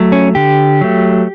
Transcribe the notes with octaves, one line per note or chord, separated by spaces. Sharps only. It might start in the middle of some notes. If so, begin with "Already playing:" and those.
Already playing: F#3 A3
C#4
D3 G4
F#3 A3